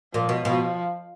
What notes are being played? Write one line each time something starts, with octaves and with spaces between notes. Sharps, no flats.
A#2 F3
B2
B2 F3